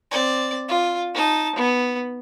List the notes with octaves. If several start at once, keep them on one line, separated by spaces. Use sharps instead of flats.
C4 D5
F4
D#4 A5
B3